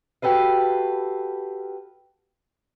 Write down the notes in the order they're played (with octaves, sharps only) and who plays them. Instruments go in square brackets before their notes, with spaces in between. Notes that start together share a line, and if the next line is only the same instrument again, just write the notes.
[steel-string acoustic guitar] F#4 G4 A4 B4 F5